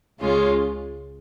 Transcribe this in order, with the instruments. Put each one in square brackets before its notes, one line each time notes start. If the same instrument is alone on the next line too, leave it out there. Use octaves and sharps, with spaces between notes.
[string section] C#2 C#3 G#3 C#4 F4